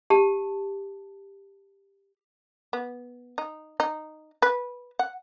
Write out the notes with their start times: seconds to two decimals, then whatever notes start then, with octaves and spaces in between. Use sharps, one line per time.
0.10 G4 A5
2.73 B3
3.38 D#4
3.80 D#4
4.42 B4
4.99 F#5